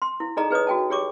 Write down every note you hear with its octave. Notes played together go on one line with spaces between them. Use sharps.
C6
E4
D#4 G#4 A4 D5 D#5 A#5
G#4 B4 C#5 D#5 D#6
F#4 G5 A5
G4 G#4 C#5 C#6 D6